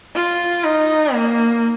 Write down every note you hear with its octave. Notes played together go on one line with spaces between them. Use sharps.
F4
D#4
A#3